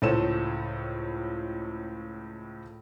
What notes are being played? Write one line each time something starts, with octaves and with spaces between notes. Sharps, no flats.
C#2 A2 A4 C5 C#5 E7